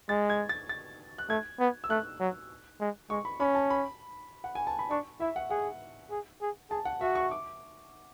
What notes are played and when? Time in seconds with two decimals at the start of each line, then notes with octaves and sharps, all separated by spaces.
0.09 G#3 A6
0.30 G#6
0.49 A6
0.69 A6
1.18 F#6
1.29 A3 G#6
1.60 B3
1.84 E6
1.90 A3 F#6
2.20 F#3
2.80 G#3
3.10 G#3 C#6
3.25 B5
3.40 C#4 B5
3.55 A5
3.70 B5
4.44 F#5
4.55 G#5
4.67 A5
4.79 B5
4.90 D4 C#6
5.20 E4 E5
5.36 F#5
5.50 G#4 F#5
6.10 G#4
6.41 G#4
6.71 G#4 A5
6.85 F#5
7.01 F#4 E5
7.15 C#6
7.31 D6